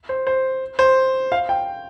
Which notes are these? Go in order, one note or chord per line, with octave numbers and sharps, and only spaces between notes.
C5
C5
C5
F5
G5